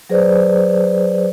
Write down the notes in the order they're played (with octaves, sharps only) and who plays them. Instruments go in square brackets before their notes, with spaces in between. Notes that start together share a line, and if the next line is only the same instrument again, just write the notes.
[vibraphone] F#3 G#4 B4 C5 D5